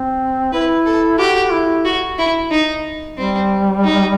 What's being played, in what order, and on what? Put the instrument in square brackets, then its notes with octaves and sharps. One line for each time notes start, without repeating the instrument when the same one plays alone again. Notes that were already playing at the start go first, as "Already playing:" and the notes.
Already playing: [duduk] C4
[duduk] E4 [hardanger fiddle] B4
[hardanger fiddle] A4
[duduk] F#4 [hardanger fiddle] G4
[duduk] E4
[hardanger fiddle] F#4
E4
D#4
[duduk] G3 [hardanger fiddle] C4
[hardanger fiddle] D#4